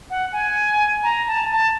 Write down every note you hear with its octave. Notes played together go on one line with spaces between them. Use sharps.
F#5
G#5
A#5
A5
A5